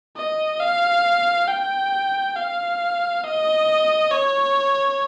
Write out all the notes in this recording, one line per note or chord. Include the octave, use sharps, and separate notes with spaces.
D#5
F5
G5
F5
D#5
C#5